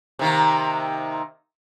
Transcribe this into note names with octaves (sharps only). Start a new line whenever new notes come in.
C3 D#3 A#3